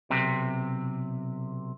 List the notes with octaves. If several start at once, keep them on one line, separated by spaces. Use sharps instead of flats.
B1 C3